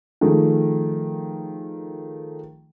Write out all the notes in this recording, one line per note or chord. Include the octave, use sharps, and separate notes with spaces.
D#3 F3 A3 G#4